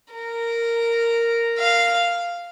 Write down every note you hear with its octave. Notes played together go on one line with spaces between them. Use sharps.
A#4
F5